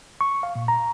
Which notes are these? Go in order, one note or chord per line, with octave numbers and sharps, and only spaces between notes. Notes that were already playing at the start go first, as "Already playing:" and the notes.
C#6
F5
A#2
A#5